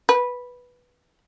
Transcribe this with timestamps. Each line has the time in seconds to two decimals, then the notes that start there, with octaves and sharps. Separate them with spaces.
0.09 B4